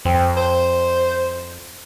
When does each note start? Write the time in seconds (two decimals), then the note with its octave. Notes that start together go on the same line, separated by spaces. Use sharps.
0.05 F2 C4
0.37 C5